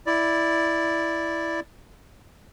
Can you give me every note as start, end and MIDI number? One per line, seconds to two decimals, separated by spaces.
0.07 1.60 64
0.07 1.60 74